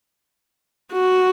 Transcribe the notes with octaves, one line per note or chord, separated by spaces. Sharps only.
F#4